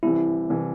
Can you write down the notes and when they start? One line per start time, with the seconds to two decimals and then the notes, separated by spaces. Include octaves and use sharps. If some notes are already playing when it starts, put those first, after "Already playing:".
0.03 C2 C3 E3 E4
0.50 C2 C3 E3